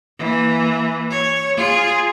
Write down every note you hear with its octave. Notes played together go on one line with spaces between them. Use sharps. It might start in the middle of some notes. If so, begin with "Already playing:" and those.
E3 A#3
C#5
F4 G#4